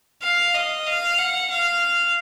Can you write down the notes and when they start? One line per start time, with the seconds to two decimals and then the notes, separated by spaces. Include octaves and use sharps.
0.22 F5
0.54 D#5
0.87 F5
1.18 F#5
1.51 F5